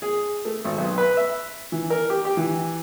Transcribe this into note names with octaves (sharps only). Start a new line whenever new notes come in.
G#4
A3
G#1
B1
B4
E5
E3
A#4
G4
G4
E3